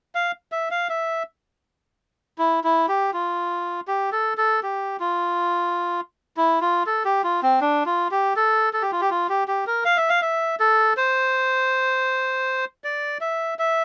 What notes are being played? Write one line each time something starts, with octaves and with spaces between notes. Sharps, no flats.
F5
E5
F5
E5
E4
E4
G4
F4
G4
A4
A4
G4
F4
E4
F4
A4
G4
F4
C4
D4
F4
G4
A4
A4
G4
F4
G4
F4
G4
G4
A#4
F5
E5
F5
E5
A4
C5
D5
E5
E5